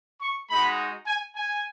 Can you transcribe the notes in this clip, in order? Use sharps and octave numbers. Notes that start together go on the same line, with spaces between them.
C#6
G#3 D#4 F#4 B5
G#5
G#5